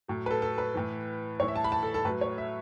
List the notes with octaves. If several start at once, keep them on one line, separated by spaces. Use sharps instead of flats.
A2 F#3
B4
A4
A4
B4
A2 E3
A2 E3 C#5
E5
A5
B5
A5
A4
A4
A2 F#3 B4
C#5
E5